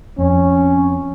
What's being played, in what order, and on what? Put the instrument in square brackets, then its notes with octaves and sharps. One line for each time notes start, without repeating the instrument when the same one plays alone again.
[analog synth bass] F2 [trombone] C#4